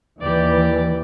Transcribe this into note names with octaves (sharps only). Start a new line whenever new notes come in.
D#2 E3 G4 D5